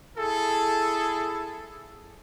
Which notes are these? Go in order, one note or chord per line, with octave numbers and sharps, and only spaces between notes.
E4 G#4 A4